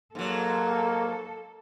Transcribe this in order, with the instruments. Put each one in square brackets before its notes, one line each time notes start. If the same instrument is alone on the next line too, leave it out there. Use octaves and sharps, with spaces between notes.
[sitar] G#2 F#3 [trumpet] A#3 [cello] A4